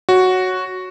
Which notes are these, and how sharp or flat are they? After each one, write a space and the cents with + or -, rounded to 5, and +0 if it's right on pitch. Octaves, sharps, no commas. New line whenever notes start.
F#4 +0 C#5 +0